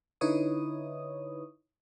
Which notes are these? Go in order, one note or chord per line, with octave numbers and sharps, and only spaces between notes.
D3 D#4 E4 B4 C#5 D#6